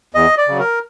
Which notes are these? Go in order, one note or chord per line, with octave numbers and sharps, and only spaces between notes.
E2 D#5
D5
C#3 F#3
A#4